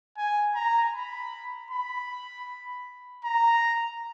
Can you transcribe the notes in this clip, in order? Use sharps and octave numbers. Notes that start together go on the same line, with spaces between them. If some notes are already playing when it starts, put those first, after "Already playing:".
G#5
A#5
B5
B5
A#5